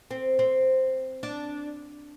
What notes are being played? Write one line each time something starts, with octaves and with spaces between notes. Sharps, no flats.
C4
C4
D4